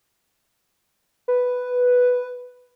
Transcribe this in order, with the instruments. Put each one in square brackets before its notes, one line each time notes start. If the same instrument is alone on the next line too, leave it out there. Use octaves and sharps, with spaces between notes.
[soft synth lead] B4